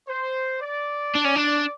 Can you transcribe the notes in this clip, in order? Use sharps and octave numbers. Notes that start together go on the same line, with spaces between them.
C5
D5
D4
C#4
D4